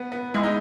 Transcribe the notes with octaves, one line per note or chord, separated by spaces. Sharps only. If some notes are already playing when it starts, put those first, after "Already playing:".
Already playing: B3
B3
G#3 E4
D#4